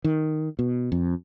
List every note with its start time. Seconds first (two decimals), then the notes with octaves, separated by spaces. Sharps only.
0.04 D#3
0.59 B2
0.92 F2